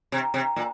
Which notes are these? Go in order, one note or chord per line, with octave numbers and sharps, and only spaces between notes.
C3
C3
A#2